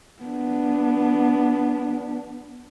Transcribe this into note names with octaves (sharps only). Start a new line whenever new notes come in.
B3 D4